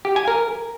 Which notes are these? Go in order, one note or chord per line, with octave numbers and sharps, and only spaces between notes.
G4
G#5
A#4